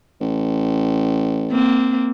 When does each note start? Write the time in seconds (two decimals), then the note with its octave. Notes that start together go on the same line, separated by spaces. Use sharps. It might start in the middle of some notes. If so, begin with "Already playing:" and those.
0.21 A1
1.51 A#3 C4